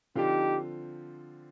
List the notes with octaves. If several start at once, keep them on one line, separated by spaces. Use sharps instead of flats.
D3 F3 C4 D#4 F4 G4